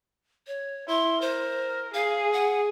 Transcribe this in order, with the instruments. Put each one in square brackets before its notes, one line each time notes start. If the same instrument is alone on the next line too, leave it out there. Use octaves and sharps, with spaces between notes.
[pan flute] C#5
[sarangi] E4 [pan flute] C6
[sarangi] A#4 [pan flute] C5
[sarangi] G#4 [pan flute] F5
[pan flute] F#5